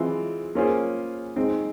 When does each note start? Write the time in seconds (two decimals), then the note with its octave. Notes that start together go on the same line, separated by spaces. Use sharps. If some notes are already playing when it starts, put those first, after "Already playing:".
Already playing: E3 G#3 C4 F4
0.55 A#3 C#4 F4 G#4 C5
1.36 G#3 C4 D#4